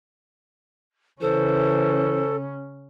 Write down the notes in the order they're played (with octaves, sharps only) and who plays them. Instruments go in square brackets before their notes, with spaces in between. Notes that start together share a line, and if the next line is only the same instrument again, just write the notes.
[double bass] C#3 C#4 [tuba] E3 [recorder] A4 [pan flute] C5